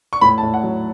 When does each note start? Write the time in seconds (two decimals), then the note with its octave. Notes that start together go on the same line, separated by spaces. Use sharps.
0.13 C#6
0.21 A2 B5
0.38 A5
0.43 A2
0.54 F#5
0.63 F#3